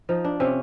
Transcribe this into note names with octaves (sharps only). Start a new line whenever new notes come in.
F3 D#4
D4
C3 C#4